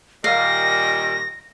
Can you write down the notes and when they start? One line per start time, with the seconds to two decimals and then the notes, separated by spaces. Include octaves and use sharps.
0.24 A#2 D#3 G3 F5 A#6